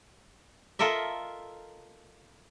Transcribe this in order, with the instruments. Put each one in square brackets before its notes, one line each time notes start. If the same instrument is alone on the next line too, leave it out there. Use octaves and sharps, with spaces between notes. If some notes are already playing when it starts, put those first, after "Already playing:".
[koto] F4 A4 A#4 D#5 E5